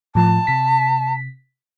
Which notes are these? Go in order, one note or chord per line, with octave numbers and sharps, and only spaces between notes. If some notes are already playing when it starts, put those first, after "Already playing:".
A2 F3 A5
C3 B6